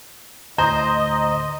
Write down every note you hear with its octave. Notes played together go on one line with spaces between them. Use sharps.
D2 A2 C5 D#5 A#5